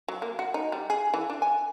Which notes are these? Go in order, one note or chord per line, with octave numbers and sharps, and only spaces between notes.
F#3
A#3
F#4
D#4
G3
G#4
E3
D4
G#5